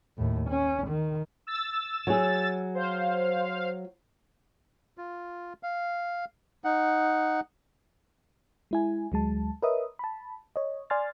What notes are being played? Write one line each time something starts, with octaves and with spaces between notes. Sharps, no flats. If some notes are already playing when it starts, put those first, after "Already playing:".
D#2 A2
C#4
D#3
E6 A6
F#3 G#4
C5 F5
F4
F5
D#4 F#5
G#3 E4 G#5
D2 F#3 G#3 A5
A#4 B4 C#5 D#5 E5 D#6
A5 B5
C#5 D#5
D5 G#5 C6 F6 A6